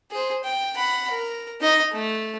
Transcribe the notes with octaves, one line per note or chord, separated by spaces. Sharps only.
G#4 C5
G5
F#5 B5
A#4
D#4 D#5
A3